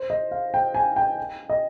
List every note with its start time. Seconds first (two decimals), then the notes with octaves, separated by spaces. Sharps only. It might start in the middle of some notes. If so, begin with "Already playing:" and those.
Already playing: C5
0.10 D#5
0.31 F5
0.54 G5
0.75 G#5
0.96 G5
1.49 D#5